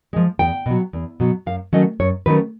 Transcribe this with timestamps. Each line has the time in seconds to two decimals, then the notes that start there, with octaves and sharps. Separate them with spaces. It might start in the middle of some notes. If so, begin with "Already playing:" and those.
0.13 F3 G#3
0.39 E2 G5
0.66 B2 F#3
0.93 E2
1.20 B2 F#3
1.46 F#2 F5
1.73 D#3 F#3 A3 C#4 D#5
2.00 F#2 C#5
2.26 D#3 F#3 A3 C#4 B4